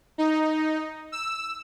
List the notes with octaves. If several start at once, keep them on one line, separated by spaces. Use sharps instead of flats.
D#4
E6